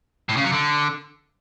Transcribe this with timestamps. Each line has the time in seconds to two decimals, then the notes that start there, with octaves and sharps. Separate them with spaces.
0.29 A2
0.37 C#3
0.44 F#3
0.52 D3